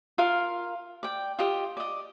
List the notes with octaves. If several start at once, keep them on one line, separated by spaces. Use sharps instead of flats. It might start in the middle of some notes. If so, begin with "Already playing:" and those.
F4 A#4 F5
D5 G5
F4 G4 D#5
D5 D#5